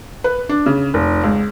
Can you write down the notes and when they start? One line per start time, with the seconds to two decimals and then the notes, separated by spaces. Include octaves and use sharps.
0.24 B4
0.49 D4
0.66 C#3
0.94 F1
1.23 C#2